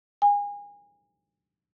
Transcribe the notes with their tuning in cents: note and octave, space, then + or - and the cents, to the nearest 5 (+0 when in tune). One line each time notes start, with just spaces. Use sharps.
G#5 -30